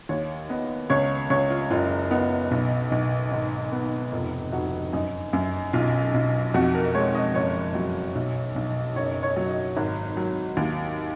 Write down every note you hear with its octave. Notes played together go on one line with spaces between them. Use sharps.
D#2 C#5
B3 D#5
C#2 C#5
C#2 C#5
F4
F#1 F4
B3 D#4
B1
B1
G#1
B3
F1 F4
F1 F#4
F#2 D#4
F#2
B1 F4
B1
F2 F#4
A#4
G#3 C#5
D#5
F#1 C#5
F#3
B1
B1
F#1 C#5
C#5
F#3
D#5
G#1
F#3
D#2